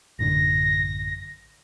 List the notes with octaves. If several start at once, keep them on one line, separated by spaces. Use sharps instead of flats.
A1 F#2 D3 A#6